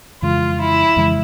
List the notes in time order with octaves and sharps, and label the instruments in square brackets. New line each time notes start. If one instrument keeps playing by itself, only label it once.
[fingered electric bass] F2 C#3 E3 G#3 [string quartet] F4
[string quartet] E4
[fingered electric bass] F2 C#3 E3 G#3